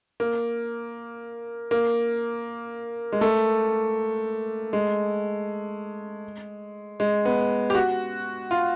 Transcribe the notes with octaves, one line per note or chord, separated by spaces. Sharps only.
A#3
A#3
G#3
A3
G#3
G#3
B3
G4
F#4
F4